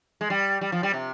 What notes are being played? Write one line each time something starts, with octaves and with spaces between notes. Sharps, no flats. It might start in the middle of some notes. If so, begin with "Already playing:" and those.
G#3
G3
G3
F3
G3
C3